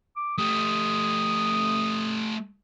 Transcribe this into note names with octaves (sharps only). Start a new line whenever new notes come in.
D6
A3 G4 D#6